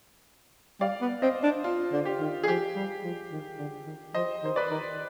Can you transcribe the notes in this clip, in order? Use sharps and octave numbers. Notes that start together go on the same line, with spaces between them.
G3 D5 F5
B3
C4 C5 D#5
D4
F4
D3
G4
D#3
G#4
F3 G4
G3
F3
D#3
D3
D#3
F3 C5 D#5
D#3 C5
B4 D5
D#3